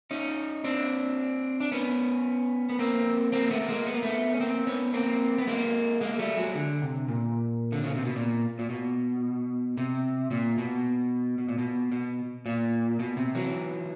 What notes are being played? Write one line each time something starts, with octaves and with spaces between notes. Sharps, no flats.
C#4 D#4
C4 D4
D4
B3 C#4
B3
A#3 C4
A#3 C4
A3 B3
B3
G#3 A#3
B3
A#3
A3 B3
C#4
A#3 C4
B3 C#4
A#3 C4
B3
G#3 A#3
G#3 A#3
A#3
G3 A3
F#3 G#3
D3
C3
A#2
D3
C#3
C3
B2
A#2
A#2
B2
C3
A#2
B2
B2
A#2
B2
B2
A#2
B2
C3
E3 F#3